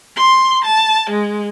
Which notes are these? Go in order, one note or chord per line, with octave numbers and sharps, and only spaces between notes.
C6
A5
G#3